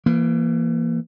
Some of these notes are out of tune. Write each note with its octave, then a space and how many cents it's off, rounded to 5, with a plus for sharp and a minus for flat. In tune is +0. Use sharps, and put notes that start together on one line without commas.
E3 +30 A#3 +0